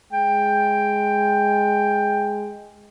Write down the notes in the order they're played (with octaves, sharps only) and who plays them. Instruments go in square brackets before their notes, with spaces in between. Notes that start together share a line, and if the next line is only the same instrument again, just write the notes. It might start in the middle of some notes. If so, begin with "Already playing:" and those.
[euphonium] G#3 [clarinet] G5